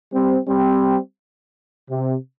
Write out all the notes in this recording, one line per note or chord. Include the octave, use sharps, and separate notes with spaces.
G3 C4
G3 C4
C3